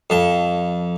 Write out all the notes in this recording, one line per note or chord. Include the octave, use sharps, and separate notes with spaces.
F2 A5